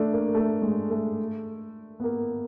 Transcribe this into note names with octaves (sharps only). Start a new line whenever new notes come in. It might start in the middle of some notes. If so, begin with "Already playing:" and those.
Already playing: A3 D4
A#3
A3
G#3
A3
B3
A#3